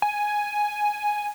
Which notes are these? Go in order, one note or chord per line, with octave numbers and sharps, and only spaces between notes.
G#5